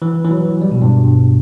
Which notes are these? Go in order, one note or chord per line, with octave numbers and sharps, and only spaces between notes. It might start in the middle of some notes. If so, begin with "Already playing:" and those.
E3
E3
F#3
G3
B2
G2